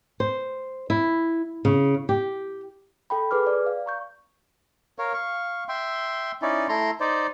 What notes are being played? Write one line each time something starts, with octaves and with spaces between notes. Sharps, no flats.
C5
E4
C#3
G4
A4 G5 B5
G#4 B4 D6 F6
D5
F5
A#5 C#6 G6
A#4 C#5 F5
F5 C#6
E5 G5 C6
C#4 D#4 E4 D5
A3 E4 A#5 C6
D#4 C5 D5